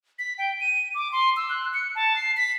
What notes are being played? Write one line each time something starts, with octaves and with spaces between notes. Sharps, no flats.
B6
G5
D#7
D6
C6
E6
F#6
C#7
A5
C7
B6